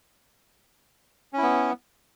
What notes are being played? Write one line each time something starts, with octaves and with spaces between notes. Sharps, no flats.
B3 C#4 E4